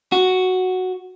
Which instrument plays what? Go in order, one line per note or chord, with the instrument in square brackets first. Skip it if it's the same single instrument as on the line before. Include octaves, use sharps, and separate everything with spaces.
[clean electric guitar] F#4